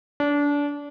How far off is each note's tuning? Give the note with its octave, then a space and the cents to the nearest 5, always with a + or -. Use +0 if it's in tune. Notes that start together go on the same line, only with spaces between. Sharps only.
D4 -25